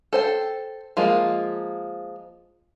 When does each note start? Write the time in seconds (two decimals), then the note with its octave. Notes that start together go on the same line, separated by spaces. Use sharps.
0.13 A4 C5 G5
0.97 F3 G#3 A#3 F4